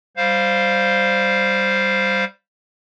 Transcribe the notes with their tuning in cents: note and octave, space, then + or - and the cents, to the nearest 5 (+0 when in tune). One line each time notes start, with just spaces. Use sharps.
G3 +0 C5 +0 F5 +0